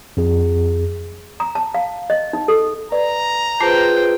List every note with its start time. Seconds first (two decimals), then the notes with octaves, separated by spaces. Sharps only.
0.17 F2 G#4
1.40 A#5
1.55 A5
1.75 F5
2.10 D#5
2.33 D#4
2.48 A4
2.92 B4 D5 A#5
3.61 F4 G#4 B4 C5 G5 A5 D6 C7